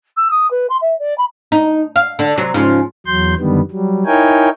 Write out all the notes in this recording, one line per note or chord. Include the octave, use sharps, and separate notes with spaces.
E6
D#6
B4
C6
E5
D5
B5
D#4
F5
D3
C3 F#3 C4
G#2 C#3 F3
E2 F#3 C6 G6
F#2 D3 D#3 G3 B3
F#3 G3
D#4 E4 A#4 C#5 G5 G#5